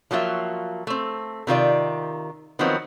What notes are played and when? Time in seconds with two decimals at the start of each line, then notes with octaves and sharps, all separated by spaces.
0.11 F3 F#3 A#3 F4 E5
0.87 A3 C4
1.47 C3 D#3 F4 D5
2.59 D#3 F3 F#3 B3 C4 D#4